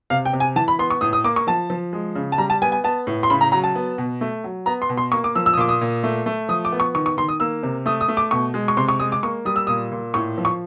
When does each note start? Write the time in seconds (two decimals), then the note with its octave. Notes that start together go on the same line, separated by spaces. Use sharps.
0.10 C3 F5
0.25 G5
0.33 C3
0.40 G#5
0.56 E3 A5
0.68 B5
0.79 B3 C6
0.90 C#6
1.01 A2 D#6
1.13 D#6
1.24 A#3 D6
1.36 C#6
1.47 F3 A5
1.70 F3
1.93 G#3
2.15 C#3
2.32 A5
2.38 G3 A#5
2.50 A5
2.62 B3 G#5
2.72 G#5
2.84 B3 A5
3.07 A2
3.23 C6
3.30 C#3 B5
3.41 A#5
3.52 F#3 A#5
3.64 A5
3.75 B3
3.98 B2
4.21 A3
4.44 F#3
4.66 B3 A#5
4.82 C6
4.89 B2
4.97 C6
5.12 A#3 C#6
5.24 D6
5.35 F3 E6
5.46 E6
5.53 D#6
5.57 A#2 D6
5.69 D#6
5.81 A#2
6.03 A3
6.26 A3
6.49 F3 D#6
6.65 D6
6.72 B3
6.80 C#6
6.95 D#3 C#6
7.06 C#6
7.17 D#3 C6
7.28 D#6
7.40 A#3 E6
7.63 C3
7.86 A3 D#6
8.01 D#6
8.08 A3
8.17 D6
8.31 B2 C#6
8.54 G#3
8.68 C#6
8.77 C3 C6
8.89 C#6
9.00 G#3 D#6
9.12 D6
9.23 A#3 C#6
9.45 G3 D#6
9.56 E6
9.67 A#2 D#6
9.92 A#2
10.14 A2 C#6
10.38 F3
10.45 C#6